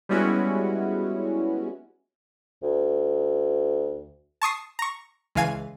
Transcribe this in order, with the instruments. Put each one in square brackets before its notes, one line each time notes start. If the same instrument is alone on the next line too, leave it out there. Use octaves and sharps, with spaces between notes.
[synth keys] G3 G#3 B3 C#4 E4 F#4
[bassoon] D2
[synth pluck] A5 C#6 D#6 C7
A#5 C#6
C#2 E3 F5 G#5 D#7